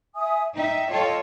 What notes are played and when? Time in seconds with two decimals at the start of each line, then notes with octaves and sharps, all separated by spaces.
0.15 E5 G#5 D#6
0.56 D#4 E5 G5
0.91 F4 A4 C#5 D#5 G5